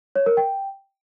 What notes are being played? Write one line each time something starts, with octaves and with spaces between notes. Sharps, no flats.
C#5
A#4
G5